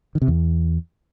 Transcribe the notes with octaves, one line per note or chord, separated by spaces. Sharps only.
D#3
C3
E2